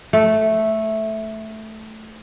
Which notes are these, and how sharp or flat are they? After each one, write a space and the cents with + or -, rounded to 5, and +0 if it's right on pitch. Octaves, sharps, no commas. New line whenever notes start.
A3 -5